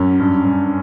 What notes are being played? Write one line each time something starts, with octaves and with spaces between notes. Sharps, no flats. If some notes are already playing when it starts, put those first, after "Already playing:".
Already playing: F#2 C#4
G2
G2